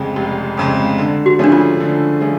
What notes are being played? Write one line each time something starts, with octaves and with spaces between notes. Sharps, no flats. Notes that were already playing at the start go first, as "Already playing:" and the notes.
Already playing: F1 F2 C#3 G#3
F1
F2 C#3 G#3
D3
F#4
F3 A3 C#4 D4 G#4
F4
D3
F3 A3 C#4 G#4